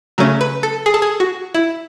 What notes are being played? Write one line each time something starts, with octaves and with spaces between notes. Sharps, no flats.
C#3 F#3 A3 C#4
B4
A4
G#4
A4
G#4
F#4
E4